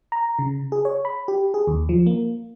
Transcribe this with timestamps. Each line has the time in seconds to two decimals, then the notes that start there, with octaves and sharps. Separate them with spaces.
0.12 A#5
0.39 C#3
0.72 G#4
0.85 C#5
1.05 B5
1.28 G4
1.54 G#4
1.67 D#2
1.89 F3
2.06 A#3